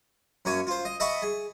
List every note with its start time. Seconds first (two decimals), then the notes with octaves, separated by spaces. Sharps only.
0.45 F#2 A#3 C#5 G#5
0.67 F4 C5
0.85 D#5
1.00 D#5 E5 F#5 A5 B5 C#6
1.22 G#4